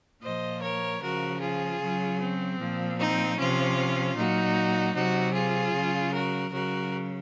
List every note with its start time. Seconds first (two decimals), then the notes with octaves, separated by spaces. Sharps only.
0.23 A#2 F3 C5 D#5
0.62 A#4 C#5
1.02 C#3 F3 F#4 A#4
1.41 F4 G#4
1.81 C#3 F#3
2.20 C4
2.59 A#2 F3
2.99 C4 D#4
3.37 C3 F3 C#4 F4
4.16 A#2 F#3 D#4 F#4
4.95 C3 F#3 D#4 F#4
5.35 F4 G#4
5.74 C#3 F#3
6.14 F#4 A#4
6.52 C#3 F#3 F#4 A#4